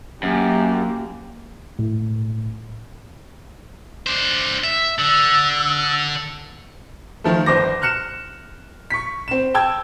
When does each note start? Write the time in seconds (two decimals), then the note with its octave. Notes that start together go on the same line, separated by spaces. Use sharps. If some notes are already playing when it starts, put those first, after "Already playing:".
0.23 F#2 A#3 G4
1.79 A2
4.07 D4 C5
4.64 E5
4.99 D3 E6
7.24 D#3 F3 A3
7.46 G1 C5 D6 A#6
7.82 F6 F#6 C#7 E7
8.90 C#6 B6
9.28 C4 E7
9.54 G5 A5 E6 G#6